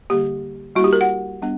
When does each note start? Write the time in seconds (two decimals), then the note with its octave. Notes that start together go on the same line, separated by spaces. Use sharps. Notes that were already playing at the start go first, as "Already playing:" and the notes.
0.10 D3 G3 A#3 G4
0.75 G3 A#3 E4 F#4
0.84 G4
0.93 A#4
1.01 F#5
1.42 G3 B3 D4